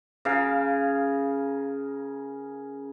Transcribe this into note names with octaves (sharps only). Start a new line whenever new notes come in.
C#3 A#4 F5